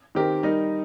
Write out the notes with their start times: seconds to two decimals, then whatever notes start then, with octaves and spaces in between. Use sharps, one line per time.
0.15 D#3 C4 G4 A#4
0.43 G3 D#4 A#4 D#5